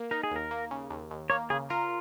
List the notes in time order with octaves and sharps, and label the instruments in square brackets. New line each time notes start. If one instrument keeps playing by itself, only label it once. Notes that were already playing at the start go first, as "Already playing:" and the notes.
Already playing: [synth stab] A#3
[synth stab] D#4 [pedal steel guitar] A#4
[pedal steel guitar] G#4
[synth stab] D#2 [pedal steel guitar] A#4
[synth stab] A#3
C#3
D#2
D#2
[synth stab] A#3 [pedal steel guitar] C#5
[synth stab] C#3 [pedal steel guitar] G#4
[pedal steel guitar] F4 [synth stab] A#4